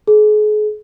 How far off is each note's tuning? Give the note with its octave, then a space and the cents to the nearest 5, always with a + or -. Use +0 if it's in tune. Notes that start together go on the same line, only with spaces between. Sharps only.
G#4 +40